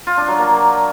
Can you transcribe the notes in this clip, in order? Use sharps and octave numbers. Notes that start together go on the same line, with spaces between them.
F4
D4
F#3
A#3